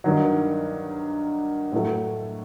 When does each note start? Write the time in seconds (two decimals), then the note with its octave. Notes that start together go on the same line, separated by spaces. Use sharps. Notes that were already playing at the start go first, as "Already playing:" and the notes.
0.04 G2 D#3 F#3
1.72 A2 F#3 A3